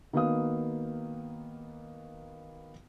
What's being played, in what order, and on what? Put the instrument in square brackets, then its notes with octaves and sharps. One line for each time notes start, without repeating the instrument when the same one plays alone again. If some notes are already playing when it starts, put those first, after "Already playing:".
[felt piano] D#3 A#3 B3 F#4 F5 D#6